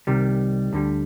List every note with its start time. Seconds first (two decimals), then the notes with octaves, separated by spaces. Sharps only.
0.07 C2 C3 D#3 G3
0.73 D2 D3 G3